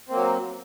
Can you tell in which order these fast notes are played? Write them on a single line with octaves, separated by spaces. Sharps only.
C4 A#3 F#3